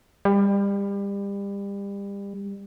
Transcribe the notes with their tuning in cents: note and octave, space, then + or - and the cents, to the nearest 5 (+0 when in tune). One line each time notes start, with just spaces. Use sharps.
G3 +30